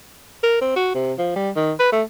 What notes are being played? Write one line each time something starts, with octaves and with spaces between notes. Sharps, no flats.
A#4
C4
F#4
C3
F3
G3
D#3
B4
A3